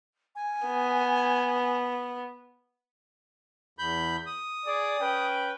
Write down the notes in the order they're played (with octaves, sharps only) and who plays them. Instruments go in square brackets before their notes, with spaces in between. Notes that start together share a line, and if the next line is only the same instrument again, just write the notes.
[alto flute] G#5
[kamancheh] B3
[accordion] E2 B5 G6
D#6
[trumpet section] G#4 D5
C#4 B4 G5